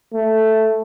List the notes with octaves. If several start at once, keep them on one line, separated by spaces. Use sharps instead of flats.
A3